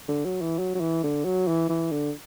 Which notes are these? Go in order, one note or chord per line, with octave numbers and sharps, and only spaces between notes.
D3
F#3
E3
F#3
F#3
E3
D3
F#3
E3
E3
D3